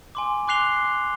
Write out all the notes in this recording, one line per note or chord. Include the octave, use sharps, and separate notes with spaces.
G#5 C6 D6
C6 D6 F#6 C7 F7 G7